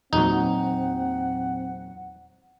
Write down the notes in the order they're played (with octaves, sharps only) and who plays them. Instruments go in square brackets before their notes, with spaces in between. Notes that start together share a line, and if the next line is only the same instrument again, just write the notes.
[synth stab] E2 A#2 F#3 [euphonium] C4 [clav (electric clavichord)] D#4 [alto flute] F#5